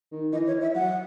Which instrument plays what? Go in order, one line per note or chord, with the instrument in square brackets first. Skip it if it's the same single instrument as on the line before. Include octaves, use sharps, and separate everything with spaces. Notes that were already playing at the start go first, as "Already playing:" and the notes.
[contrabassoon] D#3
[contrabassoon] E3 [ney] D#5
[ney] C#5
[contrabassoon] E3
[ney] E5
[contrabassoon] F#3 [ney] F#5